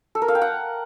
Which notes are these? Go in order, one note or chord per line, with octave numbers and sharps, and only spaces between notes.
A4
A#4
F5
G5
F#5